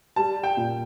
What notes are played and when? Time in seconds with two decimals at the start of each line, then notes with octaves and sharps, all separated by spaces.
0.16 G3 A5
0.44 G5
0.57 A#2